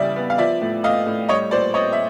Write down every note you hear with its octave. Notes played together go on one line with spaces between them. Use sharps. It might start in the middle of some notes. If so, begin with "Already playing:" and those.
Already playing: C#3 E3 G3 D5 E5
B3
F5
F3 D5 E5
A2
A3 D#5 F5
A2
G3 C#5 D#5
A#2 C5 D5
C4 C#5 D#5
E5